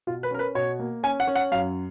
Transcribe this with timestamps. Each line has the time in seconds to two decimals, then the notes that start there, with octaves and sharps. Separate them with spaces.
0.07 B2 F4
0.23 B4
0.31 C#4 A#4
0.39 B4
0.55 B2 C#5
0.79 A#3
1.03 C#4 G#5
1.20 F#5
1.27 C#4
1.35 F#5
1.52 F#2 F5